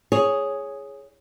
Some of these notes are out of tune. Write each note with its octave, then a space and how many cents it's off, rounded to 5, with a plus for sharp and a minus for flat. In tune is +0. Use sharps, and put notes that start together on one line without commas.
G#4 +0 C#5 +0